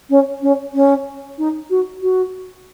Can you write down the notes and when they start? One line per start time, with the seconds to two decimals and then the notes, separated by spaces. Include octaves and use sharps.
0.10 C#4
0.42 C#4
0.74 C#4
1.38 D#4
1.70 F#4
2.02 F#4